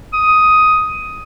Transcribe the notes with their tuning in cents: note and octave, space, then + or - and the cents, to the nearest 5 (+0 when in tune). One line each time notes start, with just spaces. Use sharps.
D#6 +10